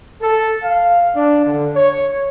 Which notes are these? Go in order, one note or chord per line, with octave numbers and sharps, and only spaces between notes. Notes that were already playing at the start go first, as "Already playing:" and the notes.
A4
F5
D4
D3
C#5